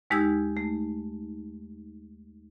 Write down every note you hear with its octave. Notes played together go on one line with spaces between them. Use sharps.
D#2 G#3 D#4 G4 E6 G#6
A3